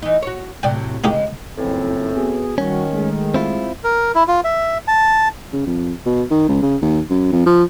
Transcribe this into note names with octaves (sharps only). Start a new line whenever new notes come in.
E3 D#4
F#4 C#5
A2 C3 F#3 D5 G5
C#3 G#3 A#3 D#4 G4
F#1 F2 A2 E3 C4
B3 F#4 G#4
D#3 G3 C#4 F#4
G#3 A3 G#4
C4 E4 F4
A#4
E4
F4
E5
A5
C#3
F2
B2
D#3
C#2
C#3
D#2
F#2
F2
F3